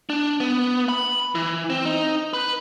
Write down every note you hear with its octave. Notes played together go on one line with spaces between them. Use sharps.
D4
B3
B5
E3
C4
D#4
B4